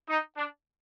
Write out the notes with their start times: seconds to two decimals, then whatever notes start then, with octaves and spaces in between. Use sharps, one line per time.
0.09 D#4
0.37 D4